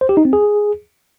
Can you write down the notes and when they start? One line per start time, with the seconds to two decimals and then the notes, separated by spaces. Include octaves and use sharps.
0.01 C5
0.09 G4
0.17 D#4
0.25 C4
0.33 G#4